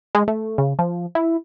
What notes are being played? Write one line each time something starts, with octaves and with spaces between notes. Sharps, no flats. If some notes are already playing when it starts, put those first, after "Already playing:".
G#3
A3
C#3
F3
E4